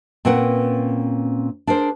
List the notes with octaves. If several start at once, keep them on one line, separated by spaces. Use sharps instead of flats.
A#2 C4 C#4 A#4 B4 F#5
D4 G#4 A#4 C5